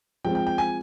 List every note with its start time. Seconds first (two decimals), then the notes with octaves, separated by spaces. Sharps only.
0.25 F3 G#3 C4 G5
0.35 G5
0.47 G5
0.58 G#5